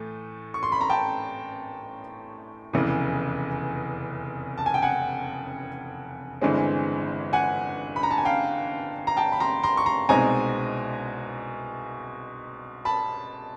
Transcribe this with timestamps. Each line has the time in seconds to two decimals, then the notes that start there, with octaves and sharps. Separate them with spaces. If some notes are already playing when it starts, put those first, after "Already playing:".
Already playing: A2 E3 A3
0.54 C#6
0.63 C6
0.72 B5
0.81 A#5
0.89 G5 A5
2.73 F1 E2 C#3 E3
4.57 A5
4.66 G#5
4.74 G5
4.82 F#5 G#5
6.41 G1 G2 E3 G#3 C4
7.33 F#5 G#5
7.96 B5
8.03 A#5
8.11 A5
8.18 G#5
8.25 F5 G5
9.07 A#5
9.17 G5 A5
9.32 B5
9.40 A#5 C6
9.63 A#5 C6
9.77 C#6
9.86 A#5 C6
10.09 C2 B2 G#3 C4 D#4 G#5 A#5
12.85 A5 B5